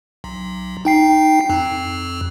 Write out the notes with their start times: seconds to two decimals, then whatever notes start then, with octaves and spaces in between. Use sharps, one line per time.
0.24 B1
0.85 D#4 G5 C7
1.50 F2